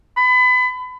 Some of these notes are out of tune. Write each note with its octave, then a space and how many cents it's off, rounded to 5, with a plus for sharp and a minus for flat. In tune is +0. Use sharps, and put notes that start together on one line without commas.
B5 +30